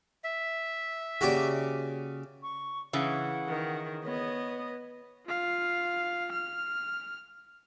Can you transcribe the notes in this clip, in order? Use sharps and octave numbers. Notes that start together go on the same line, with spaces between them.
E5
C#3 A#3 F#4 G4 D5
C#6
C#3 E3 F#5
D#3
B3 C#5 D#5
F4 F5
F6